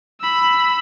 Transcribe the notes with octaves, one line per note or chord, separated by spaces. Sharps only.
B5 E6